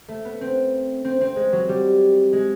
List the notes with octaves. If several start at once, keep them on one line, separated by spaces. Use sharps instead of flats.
A3
B3
C4
C4
C4
G#3
F#3
G3
G#3